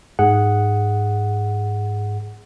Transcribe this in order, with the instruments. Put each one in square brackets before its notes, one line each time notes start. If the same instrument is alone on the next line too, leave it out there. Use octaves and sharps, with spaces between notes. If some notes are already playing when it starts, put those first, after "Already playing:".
[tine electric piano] G#2 G#4 F#5